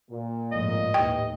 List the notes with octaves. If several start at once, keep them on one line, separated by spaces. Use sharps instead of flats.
A#2
G#1 F2 A2 D#5
D#2 A2 E3 D#4 G4 G5